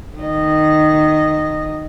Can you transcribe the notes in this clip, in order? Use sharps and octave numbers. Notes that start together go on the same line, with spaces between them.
D#3 D#5